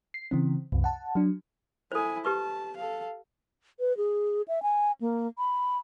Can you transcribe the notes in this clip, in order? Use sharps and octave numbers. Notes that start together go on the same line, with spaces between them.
C7
C#3 E3 C4
C2 F#2 C3
F#5 A5
F#3 D4
E4 A4 C5 G#5
G4 B4 A5 C#6
A4 F5
B4
G#4
E5
G#5
A#3
B5